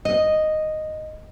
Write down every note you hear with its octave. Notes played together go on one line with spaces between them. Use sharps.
D#5